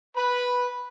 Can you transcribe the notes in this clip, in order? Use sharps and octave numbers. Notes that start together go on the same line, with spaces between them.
B4 B5